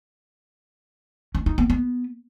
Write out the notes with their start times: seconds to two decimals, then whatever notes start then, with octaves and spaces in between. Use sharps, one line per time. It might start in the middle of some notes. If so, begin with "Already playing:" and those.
1.35 C#4
1.46 D#4
1.58 B3
1.70 B3